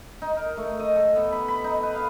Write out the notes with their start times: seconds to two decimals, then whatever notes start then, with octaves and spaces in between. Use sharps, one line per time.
0.22 D#4
0.37 A#4
0.57 A3
0.80 D#5
0.96 A4
1.16 B3
1.32 B5
1.48 B5
1.64 D#4
1.83 B4
1.95 F5